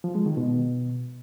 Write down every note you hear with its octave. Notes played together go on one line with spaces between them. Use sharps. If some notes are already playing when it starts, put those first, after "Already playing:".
F3
G#3
D#3
B2